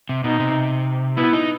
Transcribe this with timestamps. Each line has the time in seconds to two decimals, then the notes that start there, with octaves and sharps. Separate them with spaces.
0.09 C3
0.24 B2 D#4
0.40 C3
1.17 B3 E4
1.33 D#4